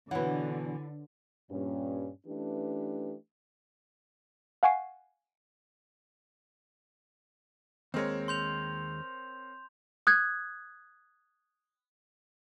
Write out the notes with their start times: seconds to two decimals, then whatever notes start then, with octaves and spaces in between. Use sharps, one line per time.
0.11 B2 D3 E3 E4 B4 C#5 F#5
1.51 G2 A#2 C#4
2.27 E3 A3 C#4 D4 G4 B4
4.63 F5 F#5 G#5 C#6 C7
7.94 D#2 G#3 C4 A#4 C#5
8.28 C6 G6 F7
10.07 D#6 F#6 G#6